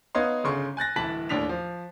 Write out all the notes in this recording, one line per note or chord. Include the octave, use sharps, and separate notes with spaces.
B3 D#4 C#5 D#5 F5 C6
G1 C#3 C6 C#6
G#5 F#6 A6 A#6
D1 E3 A5 B5 B6 F#7
D#2 A2 D4 B6 F7
F3